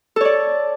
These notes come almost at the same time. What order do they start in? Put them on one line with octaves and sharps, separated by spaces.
A4 C#5 D5